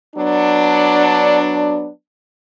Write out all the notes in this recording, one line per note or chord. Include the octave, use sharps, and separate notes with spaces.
F#3 B3 D4